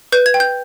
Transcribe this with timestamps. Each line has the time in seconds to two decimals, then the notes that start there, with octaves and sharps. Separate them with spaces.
0.12 B4 G6
0.26 G#6
0.34 G5
0.40 G6